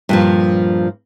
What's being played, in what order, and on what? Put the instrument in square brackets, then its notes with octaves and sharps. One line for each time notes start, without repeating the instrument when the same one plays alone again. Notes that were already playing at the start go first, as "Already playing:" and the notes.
[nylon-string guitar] G2 A#2 F3